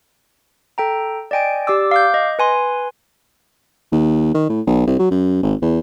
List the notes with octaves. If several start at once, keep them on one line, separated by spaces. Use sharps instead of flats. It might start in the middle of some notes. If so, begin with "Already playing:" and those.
A4 G5 A#5
D5 D#5 G5 G#5 D7
G4 D5 D6 E6
F5 D6 G6
D#5
B4 G#5 C6
D#2
D#3
A2
B1
C2
F#3
F#2
G#1
E2